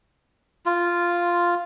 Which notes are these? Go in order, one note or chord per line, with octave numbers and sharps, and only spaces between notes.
F4